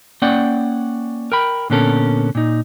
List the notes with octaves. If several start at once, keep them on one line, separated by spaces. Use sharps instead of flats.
A#3 C#4 D5 F#5 G5
A#4 G5 B5
A#2 D3 B3 C#4 A4 A#4
A#2 D#4